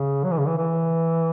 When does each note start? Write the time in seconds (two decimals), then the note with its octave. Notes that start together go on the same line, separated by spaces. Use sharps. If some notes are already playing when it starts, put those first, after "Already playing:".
Already playing: C#3
0.24 F#3
0.31 E3
0.39 C#3
0.47 E3
0.57 E3